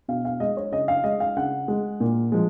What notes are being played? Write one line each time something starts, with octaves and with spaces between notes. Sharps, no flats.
B2 F5
F5
G#3 D#5
C#5
C#3 D#5
F5
G#3 D#5
F5
C#3 F#5
G#3
A#2
F3 G#3